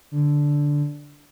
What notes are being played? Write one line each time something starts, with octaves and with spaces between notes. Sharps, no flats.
D3